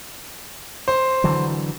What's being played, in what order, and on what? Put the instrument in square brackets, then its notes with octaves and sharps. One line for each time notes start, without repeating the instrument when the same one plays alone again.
[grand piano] C5
[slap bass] D3 E3 F#3